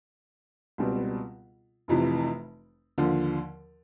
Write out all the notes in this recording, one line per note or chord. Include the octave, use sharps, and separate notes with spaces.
C#2 B2 G3 C4
F1 F2 C3 E3
D#2 D3 F3